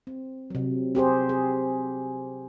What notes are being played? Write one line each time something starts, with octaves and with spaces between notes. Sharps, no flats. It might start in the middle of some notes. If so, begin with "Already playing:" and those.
C4
C3 F#3
C4 G4 G#4 C5
G#4